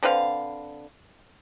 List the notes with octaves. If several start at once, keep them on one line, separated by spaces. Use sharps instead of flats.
D3 C4 B4 F5